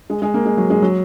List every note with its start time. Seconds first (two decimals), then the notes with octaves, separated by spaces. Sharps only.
0.10 G#3
0.22 G#3
0.34 A#3
0.45 G#3
0.57 F#3
0.70 G#3
0.82 F#3